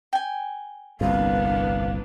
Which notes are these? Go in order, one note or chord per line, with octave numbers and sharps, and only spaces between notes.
G5 G#5
G1 C2 F2 A#3 B3 D4 F5